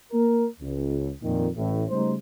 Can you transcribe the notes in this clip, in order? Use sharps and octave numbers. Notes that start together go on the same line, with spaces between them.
A#3 A#4
C#2
F2 A#2 D#3
A1 A2
C#3 G3 A3 D#4 C5